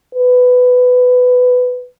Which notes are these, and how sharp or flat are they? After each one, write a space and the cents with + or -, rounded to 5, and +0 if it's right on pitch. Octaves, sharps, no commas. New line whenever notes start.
B4 +15